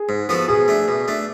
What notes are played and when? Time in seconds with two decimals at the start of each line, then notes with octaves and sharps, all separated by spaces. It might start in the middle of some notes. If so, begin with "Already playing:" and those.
Already playing: G#4
0.09 G#2
0.29 F3 B3 F#4 A4
0.48 B2 G#4
0.68 A3 D4
0.88 B2
1.08 A3 D4